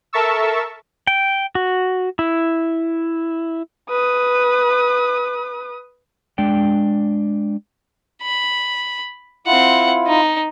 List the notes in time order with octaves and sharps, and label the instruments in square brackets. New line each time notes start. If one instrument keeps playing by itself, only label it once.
[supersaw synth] A4 A#4 E5 A5 C#6 E6
[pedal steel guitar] G5
F#4
E4
[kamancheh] B4 D#6
[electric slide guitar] G#3 D4 D5 G5
[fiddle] B5
[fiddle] C4 F#5 [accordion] E4 F4
[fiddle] D#4